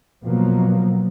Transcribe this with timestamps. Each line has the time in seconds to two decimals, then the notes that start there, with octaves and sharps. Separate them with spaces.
0.24 B2 F3 F#3 A#3